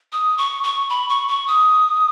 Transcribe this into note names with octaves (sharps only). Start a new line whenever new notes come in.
D#6
C#6
C#6
B5
C#6
C#6
D#6